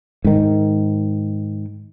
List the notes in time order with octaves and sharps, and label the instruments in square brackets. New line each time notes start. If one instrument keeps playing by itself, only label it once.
[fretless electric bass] G#2 D#3